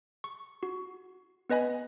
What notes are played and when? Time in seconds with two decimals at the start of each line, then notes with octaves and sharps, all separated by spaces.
0.24 C#6
0.63 F#4
1.50 B3 B4 D#5 G#5 B5